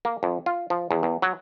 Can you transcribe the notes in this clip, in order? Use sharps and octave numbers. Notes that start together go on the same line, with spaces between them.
A#3
F2
F4
F3
E2
E2
F#3